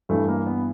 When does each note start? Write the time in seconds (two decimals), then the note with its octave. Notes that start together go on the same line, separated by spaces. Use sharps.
0.09 G2 E3 A3
0.28 A#3
0.47 B3